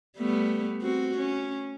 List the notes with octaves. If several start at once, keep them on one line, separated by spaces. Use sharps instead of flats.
G3 A3 B3
C4 F#4
C#4